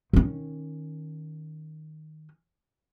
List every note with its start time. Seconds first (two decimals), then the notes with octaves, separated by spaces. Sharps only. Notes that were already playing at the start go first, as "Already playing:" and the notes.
0.13 D#3 C#4